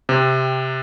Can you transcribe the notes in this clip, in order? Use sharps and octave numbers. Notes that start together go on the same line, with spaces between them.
C3 C4